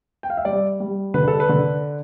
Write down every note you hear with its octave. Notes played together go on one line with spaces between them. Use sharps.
G5
F5
E5
G3 D5
G3
D3 B4
A4
B4
D3